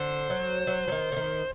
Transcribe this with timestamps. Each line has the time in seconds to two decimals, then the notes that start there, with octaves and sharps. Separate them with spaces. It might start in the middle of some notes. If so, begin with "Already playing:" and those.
Already playing: D3 C5
0.30 F#3
0.67 F#3
0.88 F#3
0.92 D#3
1.12 D3
1.16 D#3